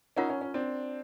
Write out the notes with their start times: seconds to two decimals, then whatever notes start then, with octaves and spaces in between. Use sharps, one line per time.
0.16 C#4 D#4 F4 A#4 C#5 F#5 A#5
0.29 C#4
0.41 C#4
0.54 C4 D4